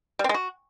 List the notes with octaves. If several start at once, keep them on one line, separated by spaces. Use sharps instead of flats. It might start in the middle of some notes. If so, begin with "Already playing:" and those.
G3
C4
G#3
F#4